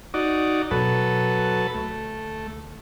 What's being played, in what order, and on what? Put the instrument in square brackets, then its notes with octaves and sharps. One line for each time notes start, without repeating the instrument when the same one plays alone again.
[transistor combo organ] D#4 F#4 D5
[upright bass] B2 [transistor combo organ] F#3 A4 B4
[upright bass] D2 [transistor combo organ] A3